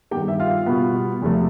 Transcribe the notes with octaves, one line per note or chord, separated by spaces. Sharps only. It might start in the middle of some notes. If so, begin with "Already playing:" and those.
G2 D#3 G3 B3 G4 G5
E5
F4 F5
B2 G3 B3
E2 C3 F3 A3